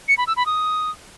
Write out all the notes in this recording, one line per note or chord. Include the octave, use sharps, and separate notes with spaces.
C#7
B5
E6
B5
D#6